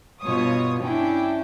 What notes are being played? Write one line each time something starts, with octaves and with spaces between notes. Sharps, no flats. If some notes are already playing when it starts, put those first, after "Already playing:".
G2 B2 F4 C#5 D#6
C#4 D4 E4 G5